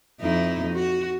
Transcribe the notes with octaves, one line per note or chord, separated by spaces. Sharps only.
F2 D#4 E4
F#4